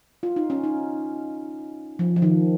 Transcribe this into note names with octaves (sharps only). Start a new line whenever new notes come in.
F4
D#4
C#4
D#4
F3
F3
D#3